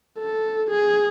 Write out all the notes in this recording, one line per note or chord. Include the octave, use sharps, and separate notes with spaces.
A4
G#4